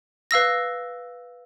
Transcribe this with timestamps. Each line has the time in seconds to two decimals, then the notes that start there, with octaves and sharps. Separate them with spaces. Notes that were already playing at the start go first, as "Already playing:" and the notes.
0.31 B4 F5 E6 A#6